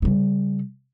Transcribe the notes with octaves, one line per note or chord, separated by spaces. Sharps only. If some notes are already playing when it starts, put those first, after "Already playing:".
C#3 G3